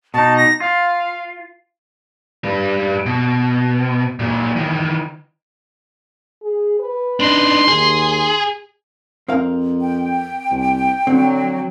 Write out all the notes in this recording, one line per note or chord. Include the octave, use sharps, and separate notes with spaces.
B2 D#4 A5
A#6
F4 F5
G3 B4
B2
A#2 F#3
D#3 E3
G#4
B4
D4 D#4 C6
D#2 G#4
F2 C4 A#4 F5
G5
C2
D3 F#3 C4